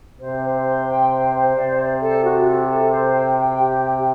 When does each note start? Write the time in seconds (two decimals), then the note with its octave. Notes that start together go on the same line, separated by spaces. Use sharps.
0.21 C3 C5
0.43 C5
0.66 C6
0.88 G5
1.11 C5
1.34 C5
1.55 C3 D5
1.78 D5
2.01 A4
2.24 F#4
2.46 A4
2.68 A4
2.91 C5
3.14 G5
3.36 G5
3.58 G4
3.81 G5